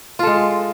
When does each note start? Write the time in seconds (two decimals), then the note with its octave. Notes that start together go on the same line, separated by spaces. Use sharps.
0.19 F4
0.23 A4
0.27 G#3